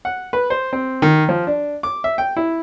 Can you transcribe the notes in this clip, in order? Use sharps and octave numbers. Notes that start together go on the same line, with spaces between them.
F#5
B4
C5
C4
D#3
F3
D4
D6
E5
G5
E4